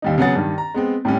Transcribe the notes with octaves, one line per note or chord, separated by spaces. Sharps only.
D#2 G3 D#4
C#3 F#3 B3 G#4 F#5 A6
G2 D#3
A#5
G#3 B3 C4
A2 G3 C#4